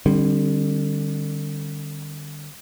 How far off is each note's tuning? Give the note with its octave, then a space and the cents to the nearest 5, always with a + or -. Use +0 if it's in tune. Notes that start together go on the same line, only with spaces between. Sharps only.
D3 +35 G3 +5 C#4 -35